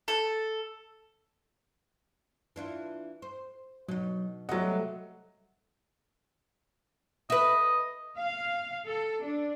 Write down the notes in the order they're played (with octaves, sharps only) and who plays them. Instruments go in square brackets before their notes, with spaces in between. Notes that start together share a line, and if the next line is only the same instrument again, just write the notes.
[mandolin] A4
[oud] E3 D4 F4
C5
[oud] B2 D#4 [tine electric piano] F#3
[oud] C3 G3 A3 [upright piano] F#3 D#5 [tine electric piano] F#5
[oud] B4 E5 [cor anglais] D#5
[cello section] F5
A4
D4